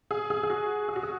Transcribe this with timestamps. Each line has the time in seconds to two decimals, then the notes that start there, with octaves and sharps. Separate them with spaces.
0.11 G#4
0.30 G#4
0.43 G#4
0.50 F#4
0.89 G#4
0.96 F#4
1.03 G#4